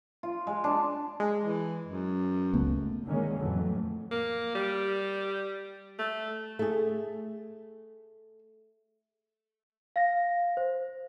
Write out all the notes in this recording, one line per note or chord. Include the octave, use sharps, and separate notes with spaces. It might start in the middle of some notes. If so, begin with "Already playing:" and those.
F4
G#3
D4
G#3
E3
F#2
C#2 A3 B3
D3 D#3 G#3 A#3 C#4
F2 A2 E3 F#3 A3
A#3
G3
A3
A3 G#4
F5 A#6
C5